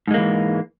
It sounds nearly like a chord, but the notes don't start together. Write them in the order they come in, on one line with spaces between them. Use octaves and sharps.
G#2 G#3 A#3 E3